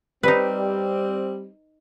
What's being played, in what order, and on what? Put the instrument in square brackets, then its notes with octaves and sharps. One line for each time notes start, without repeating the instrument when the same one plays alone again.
[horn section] G3 C4 [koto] D#4 B4